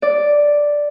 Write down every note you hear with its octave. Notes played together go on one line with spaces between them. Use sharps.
D5